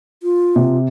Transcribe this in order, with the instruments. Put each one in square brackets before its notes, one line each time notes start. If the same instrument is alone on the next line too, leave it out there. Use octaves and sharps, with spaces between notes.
[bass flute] F4
[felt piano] C3